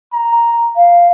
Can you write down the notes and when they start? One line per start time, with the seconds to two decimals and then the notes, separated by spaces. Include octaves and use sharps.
0.13 A#5
0.76 F5